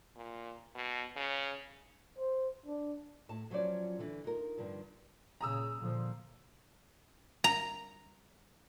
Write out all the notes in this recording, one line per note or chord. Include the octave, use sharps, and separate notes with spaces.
A#2
B2
C#3
C5
D4
A2 A5
F3 F#3 C#4 F4 C5 D5
D3 E3
D#4 F4 A#4
G2 D3 D#3 F3
A#2 C#3 A#5 D#6 E6
A#2 D3 F3
A#5